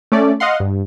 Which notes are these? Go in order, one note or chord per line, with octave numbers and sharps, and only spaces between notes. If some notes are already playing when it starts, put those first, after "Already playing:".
A3 C#4 D5
D#5 F5 F#5 C6
G2